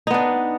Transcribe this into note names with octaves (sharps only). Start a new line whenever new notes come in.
B3 D4 D#4